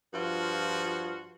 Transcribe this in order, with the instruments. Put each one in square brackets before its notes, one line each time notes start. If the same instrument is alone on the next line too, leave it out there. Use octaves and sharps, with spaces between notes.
[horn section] G2 F3 F4 F#4